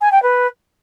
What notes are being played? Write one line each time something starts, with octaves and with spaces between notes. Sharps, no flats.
G#5
G5
B4